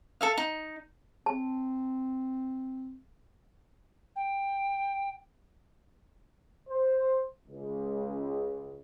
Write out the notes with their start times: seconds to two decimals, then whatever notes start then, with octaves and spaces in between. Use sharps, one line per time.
0.21 A4 E5 F5
0.37 D#4
1.26 C4 A5
4.16 G5
6.69 C5
7.47 C#2